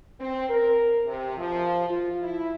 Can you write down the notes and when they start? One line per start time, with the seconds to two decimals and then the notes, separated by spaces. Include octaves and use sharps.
0.20 C4
0.49 A#4
1.06 C3
1.38 F3
1.88 F4
2.21 E4